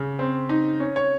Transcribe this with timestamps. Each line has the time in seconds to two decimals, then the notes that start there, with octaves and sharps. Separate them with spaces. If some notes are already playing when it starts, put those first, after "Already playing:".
Already playing: C#3
0.19 C4
0.49 D#4
0.80 C#4
0.96 C#5